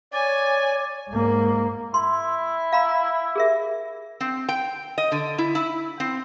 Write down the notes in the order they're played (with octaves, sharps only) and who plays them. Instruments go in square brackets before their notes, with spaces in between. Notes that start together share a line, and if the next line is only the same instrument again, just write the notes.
[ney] C#5 [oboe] D5 [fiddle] G#5
[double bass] G#2 A#3
[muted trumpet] E4 [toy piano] C6
[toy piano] F5 A#5 B5
G#4 A#4 E5
[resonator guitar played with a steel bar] C4
G5
D#5
D3
E4
E4
C4